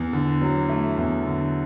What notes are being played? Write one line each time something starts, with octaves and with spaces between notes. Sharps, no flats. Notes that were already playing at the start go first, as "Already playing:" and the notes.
Already playing: E2
D3
F#3
A3
E2
D3